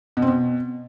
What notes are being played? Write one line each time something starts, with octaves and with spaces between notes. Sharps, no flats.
B2
C4
B2